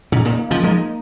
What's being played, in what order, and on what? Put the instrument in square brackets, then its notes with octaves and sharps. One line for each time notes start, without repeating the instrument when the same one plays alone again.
[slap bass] A#2 C#3 [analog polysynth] D#4
[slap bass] A#2 C#3
[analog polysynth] A#3
[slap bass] C#3 F3
[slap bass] F3 G#3 [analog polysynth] D#4